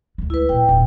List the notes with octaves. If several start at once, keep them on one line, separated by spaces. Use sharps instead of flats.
D2 G#3
E4 B4
B1 A#2 G5
E1 A#1